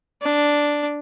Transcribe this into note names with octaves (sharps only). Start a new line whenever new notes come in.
D4